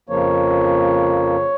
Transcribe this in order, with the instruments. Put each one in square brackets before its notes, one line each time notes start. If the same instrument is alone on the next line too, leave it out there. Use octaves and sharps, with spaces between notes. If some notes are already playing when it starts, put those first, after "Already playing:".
[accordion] F2 C#3 F3 A#3 C#5